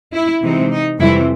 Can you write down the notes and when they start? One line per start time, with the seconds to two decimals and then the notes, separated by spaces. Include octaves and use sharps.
0.14 E4
0.42 C3 E3 G#3 C4 D#4
0.71 D#4
0.99 F2 C3 E3 G3 C4 E4